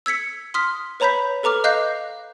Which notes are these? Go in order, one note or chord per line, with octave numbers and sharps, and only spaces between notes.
E6 G#6 B6 C#7
C6 D#6 F6 B6
B4 C#5 A#5 B5 G6 B6
A4 B4 A#5 D6 F6
D#5 F5 F#6 G6 A#6 C7